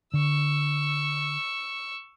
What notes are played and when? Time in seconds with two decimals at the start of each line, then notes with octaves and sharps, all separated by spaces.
0.14 D3 C#6 E6